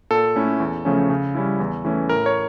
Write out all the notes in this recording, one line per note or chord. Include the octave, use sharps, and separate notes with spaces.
A#2 A4
A3 C#4 E4
E2
C#3 F3 A3 C#4
C#3
G3 C#4 E4
E2
E3 A3 C#4 E4
A2 A#4
C#5